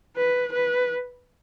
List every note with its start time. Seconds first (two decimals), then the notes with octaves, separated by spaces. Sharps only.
0.16 B4
0.52 B4